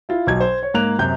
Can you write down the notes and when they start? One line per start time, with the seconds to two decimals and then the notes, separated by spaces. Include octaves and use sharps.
0.09 E4 F4
0.27 B1 F#3 G#6
0.40 C5
0.63 C#5
0.74 G#2 A#3 F#6 F7
0.99 F#2 C3 G6